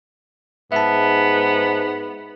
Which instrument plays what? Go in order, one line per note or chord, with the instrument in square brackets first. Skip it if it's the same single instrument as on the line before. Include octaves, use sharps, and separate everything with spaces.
[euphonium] G#2 [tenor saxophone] B3 [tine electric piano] E5 A5